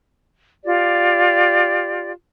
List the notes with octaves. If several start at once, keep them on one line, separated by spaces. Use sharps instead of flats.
F4 G4 D5